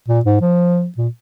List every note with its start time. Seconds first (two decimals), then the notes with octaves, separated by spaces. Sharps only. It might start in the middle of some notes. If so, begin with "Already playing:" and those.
0.08 A#2
0.25 G#2
0.41 F3
0.98 A#2